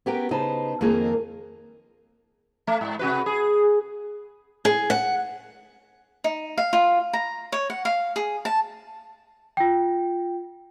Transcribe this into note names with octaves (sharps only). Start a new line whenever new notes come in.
B3 C#4 G4 A#4 B4 G5
C#3 D#4 B4 C5 A5
F2 D#3 F3 A#3 G#4 A#4
A3
G#2
C3 F#4 B4
G#4
G#4
F#5
D#4
F5
F4
A#5
C#5
F#5
F5
G#4
A5
F4 G5